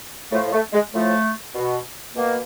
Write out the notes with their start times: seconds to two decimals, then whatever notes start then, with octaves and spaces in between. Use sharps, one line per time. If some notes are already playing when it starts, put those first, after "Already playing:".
0.32 A2 F3 A3
0.53 A3
0.73 G#3
0.93 A2 F3 A3
1.55 B2
2.16 B2 A#3